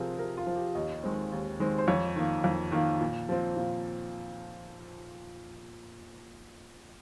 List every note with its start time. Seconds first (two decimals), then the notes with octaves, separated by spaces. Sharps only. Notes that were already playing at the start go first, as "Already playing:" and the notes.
Already playing: C3 F3 C4 G#4 A#4
0.19 C3 A#4
0.37 F4
0.47 F3 C4
0.56 G4
0.75 D#2 D#5
1.03 D#3 G#3 C4
1.32 D#2
1.59 D#3 G#3 C4
1.78 C5
1.88 F2 C#5
2.16 D#3 A#3
2.44 F2
2.72 D#3 A#3
3.01 A#2
3.29 F3 C4
3.57 A#2